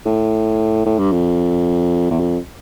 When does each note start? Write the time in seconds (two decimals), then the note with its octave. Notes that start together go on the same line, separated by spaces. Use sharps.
0.06 A2
0.86 A2
0.99 G2
1.12 F2
2.11 E2
2.20 F2